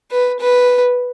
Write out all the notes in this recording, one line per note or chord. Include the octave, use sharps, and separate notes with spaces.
B4
B4